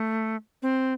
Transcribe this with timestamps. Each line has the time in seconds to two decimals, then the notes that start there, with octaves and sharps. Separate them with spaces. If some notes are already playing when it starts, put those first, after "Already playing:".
Already playing: A3
0.62 C4